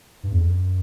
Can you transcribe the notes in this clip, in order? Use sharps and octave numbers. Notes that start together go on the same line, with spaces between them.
G2
E2
F2
F#2